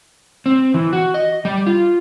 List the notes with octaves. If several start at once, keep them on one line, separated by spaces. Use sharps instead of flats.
C4
E3
F#4
D#5
G3
F4